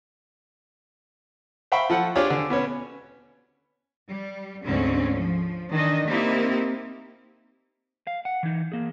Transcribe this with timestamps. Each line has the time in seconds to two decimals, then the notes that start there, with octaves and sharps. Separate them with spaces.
1.72 C5 E5 F5 G5 B5 C#6
1.90 F3 A4 F#5
2.15 D4 F4 G4 G#4 C5 C#5
2.30 D3
2.50 B2 B3 C#4
4.09 G3
4.65 D2 G#2 C4 C#4
5.16 F3
5.72 D#3 E3 D4 D#4 D#5
6.08 A#3 C4 D#4 E4 G4
8.07 F5
8.25 F#5
8.43 E3 D#4
8.72 A#3 G#4